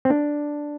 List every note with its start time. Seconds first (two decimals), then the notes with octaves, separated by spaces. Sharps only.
0.05 C4
0.10 D4